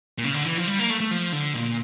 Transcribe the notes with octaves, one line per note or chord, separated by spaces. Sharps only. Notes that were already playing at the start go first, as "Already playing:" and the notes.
A#2
C#3
D3
E3
F3
G3
A#3
A3
A3
F3
D3
A#2